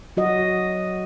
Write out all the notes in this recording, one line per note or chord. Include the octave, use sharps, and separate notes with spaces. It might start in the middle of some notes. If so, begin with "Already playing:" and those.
F#3 F#4 D#5